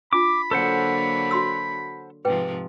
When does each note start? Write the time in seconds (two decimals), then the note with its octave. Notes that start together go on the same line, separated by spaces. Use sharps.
0.13 D4 F4 B5 D6
0.51 D3 F#3 A#3 A4 C5 F#5
1.31 F#4 C6 E6
2.25 G#2 C3 F3 G#4 B4 G5